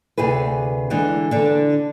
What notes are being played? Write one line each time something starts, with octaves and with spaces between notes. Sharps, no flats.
D2 C3 E4 G#4 B4
D3 E3 G#3
D3 D4